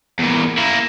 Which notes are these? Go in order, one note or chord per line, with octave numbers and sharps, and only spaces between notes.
E2 A#2
A#3 E4